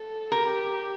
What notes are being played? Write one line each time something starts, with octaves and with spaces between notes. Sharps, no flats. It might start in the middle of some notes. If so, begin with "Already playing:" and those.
Already playing: A4
G4 A#4